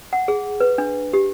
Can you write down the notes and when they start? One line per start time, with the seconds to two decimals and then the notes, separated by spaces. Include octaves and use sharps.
0.13 F#5
0.28 G#4
0.60 B4
0.78 D4
1.13 G4